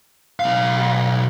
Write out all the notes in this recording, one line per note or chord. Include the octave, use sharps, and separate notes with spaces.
B1 F5